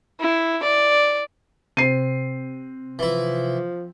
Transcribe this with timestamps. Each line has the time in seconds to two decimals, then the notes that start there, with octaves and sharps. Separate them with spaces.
0.21 E4
0.63 D5
1.77 C3 C4 C7 D#7
2.99 E3 F3 E4